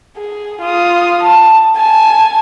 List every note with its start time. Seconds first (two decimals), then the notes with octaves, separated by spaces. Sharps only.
0.17 G#4
0.62 F4 D#6
1.24 A5
1.76 G#5 A5